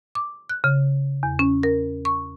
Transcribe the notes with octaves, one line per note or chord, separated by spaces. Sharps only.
D6
F#6
C#3
E2
C#4
A#4
C#6